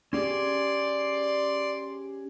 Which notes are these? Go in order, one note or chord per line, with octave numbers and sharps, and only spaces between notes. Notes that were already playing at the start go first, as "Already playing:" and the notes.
C#4 G4 G#4 D5 C6